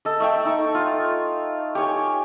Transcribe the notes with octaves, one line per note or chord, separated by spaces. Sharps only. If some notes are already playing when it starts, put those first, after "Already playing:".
A4 D#5
A3 E5 G5
D#4 C#6
F4
G4 C#5 G#5